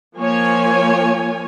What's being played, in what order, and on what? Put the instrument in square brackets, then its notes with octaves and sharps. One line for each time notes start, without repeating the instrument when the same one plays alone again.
[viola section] F3 A#3 C#5 G#5